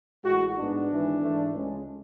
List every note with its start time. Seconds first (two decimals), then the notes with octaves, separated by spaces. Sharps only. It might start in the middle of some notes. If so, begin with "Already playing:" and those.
0.24 A1 A2 G#3 F#4
0.56 G#2 G#3 B3 D4
0.89 G#1 G#2 E3
1.22 G#2 E3 A3
1.55 C#2 C#3 G#3